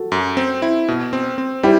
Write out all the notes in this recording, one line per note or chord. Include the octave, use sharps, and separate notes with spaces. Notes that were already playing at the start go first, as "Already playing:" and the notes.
Already playing: F#4 A4
F#2
C4
E4
B2
C4
C4
G3 E4 G4